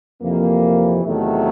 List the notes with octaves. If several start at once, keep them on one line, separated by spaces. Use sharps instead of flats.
F2 C3 E3 A#3
E2 C3 D#3 F#3 A3